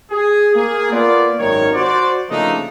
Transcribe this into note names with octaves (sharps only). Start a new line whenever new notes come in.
G#4
A#3 G#4
A#3 B3 F4 D5
G#1 F#2 D#3 A#4 C#5
F#4 C5 D5
C#3 F3 A3 A#3 D4 D#4